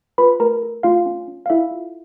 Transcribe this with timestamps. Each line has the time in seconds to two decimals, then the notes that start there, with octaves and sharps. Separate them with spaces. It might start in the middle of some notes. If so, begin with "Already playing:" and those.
0.18 F4 B4 B5
0.40 A3 A#4 A#5
0.62 A4
0.83 A3 F4 F5
1.06 C#4
1.28 C#4
1.46 F5
1.50 E4 A4 E5
1.71 F4